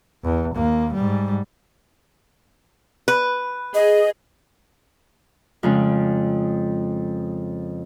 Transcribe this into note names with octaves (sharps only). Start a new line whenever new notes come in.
E2
D#2 A#3
G#2 G3
B4
G#4 D#5
F2 C#3 G#3